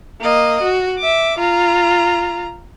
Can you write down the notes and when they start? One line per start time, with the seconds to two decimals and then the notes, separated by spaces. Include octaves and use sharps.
0.21 A#3 D#5
0.62 F#4
0.99 E5 D6
1.38 F4 A#5